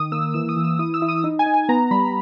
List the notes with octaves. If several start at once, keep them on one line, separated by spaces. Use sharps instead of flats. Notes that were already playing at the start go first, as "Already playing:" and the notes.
Already playing: D#3 D#6
A#3 E6
E3 E6
D#6
E3
E6
E4 D#6
E6
E4
D#6
D#4
G#5
D#4
G#5
B3 A#5
G3 B5